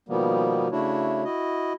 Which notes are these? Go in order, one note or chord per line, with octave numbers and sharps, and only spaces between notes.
B2 D#3 F3 G3 A#3 B3
C#3 A3 D4 E4 F#4 C#5
E4 F#4 D#5